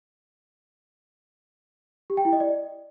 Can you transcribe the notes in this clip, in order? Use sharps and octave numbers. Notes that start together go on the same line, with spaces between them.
G4
G5
E4
D#5
D5